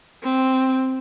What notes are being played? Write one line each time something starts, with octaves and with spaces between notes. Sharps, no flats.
C4